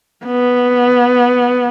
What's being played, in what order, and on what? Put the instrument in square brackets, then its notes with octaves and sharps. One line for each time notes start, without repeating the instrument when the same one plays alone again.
[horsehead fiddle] B3